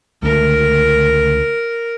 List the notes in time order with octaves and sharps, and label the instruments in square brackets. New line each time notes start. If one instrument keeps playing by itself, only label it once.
[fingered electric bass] C#2 D3 A3 [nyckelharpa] A#4